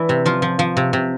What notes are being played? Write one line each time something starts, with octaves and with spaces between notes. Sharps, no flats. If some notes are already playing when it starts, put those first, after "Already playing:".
Already playing: E3 D4 E4
C3
F3 F4
F3
F3
C3
C3